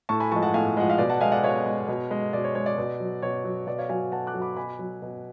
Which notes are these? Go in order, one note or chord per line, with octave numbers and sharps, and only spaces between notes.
A2 A5 C#6
G#5 B5
F3 G#3 A5 C#6
F#5 A5
A2 F5 G#5
F3 G#3 F#5
F5
B2 D5
F#5 A5
G#3 F5 G#5
D5 F#5
B2 C#5 F5
G#3
B2
G#3
B2 D5
C#5
G#3 C#5
D5
B2
F#3
B2 C#5
F#3
B2 D5
C#5 F5
F#3 F5 G#5
B2 F#5 A5
D6 F#6
F#3
B5 D6
B2 G#5 B5
F#3
B2